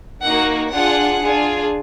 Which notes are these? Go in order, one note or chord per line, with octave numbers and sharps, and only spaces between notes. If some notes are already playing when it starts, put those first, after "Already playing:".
A#3 D#4 F#4 F#5
D4 F4 G#4 F#5
D4 F4 G#4